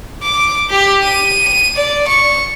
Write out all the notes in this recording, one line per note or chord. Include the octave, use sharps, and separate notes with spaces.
D6
G4
D#7
D5
C#6